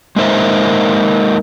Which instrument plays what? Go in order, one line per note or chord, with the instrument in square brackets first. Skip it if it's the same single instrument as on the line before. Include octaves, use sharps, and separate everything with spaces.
[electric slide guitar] G#3 A#3 D#4 C5 E5